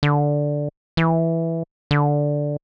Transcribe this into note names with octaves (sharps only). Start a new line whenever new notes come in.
D3
E3
D3